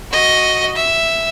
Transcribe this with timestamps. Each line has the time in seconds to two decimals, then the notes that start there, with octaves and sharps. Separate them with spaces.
0.11 F#4 D#5
0.76 E5